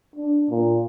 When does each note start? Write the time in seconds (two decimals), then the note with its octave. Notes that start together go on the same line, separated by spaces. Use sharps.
0.16 D4
0.50 A#2